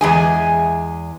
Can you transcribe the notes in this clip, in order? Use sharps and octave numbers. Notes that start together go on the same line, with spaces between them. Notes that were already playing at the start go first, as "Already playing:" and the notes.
E2 G#3 G#5